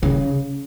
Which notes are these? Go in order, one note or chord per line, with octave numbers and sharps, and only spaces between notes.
C#3